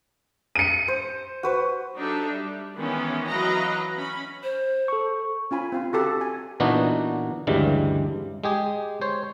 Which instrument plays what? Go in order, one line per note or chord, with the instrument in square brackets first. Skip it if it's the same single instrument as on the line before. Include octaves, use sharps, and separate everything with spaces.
[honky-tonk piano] C#7 D#7
[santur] C5
F#4 B4 C5
[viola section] F#3 D4 D#4 G4 A4 E5
G3
D#3 E3 G#3 B3 C#4
E3 F#3 B4 D#5 F5 A#5
C#4 B5
[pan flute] C5
[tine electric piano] A4 C#6
[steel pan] C#4 F4 G#5 B5
C4 F4
F#4 G4 A4
G#5
[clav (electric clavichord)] A#2 E3 B3 D4 D#4 F#4
D2 G2 C#3 E3 G3 G#3
G#3 G4 G#4
C5 C#5